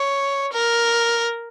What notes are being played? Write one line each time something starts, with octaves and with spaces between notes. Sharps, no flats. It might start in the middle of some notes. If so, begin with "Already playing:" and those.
Already playing: C#5
A#4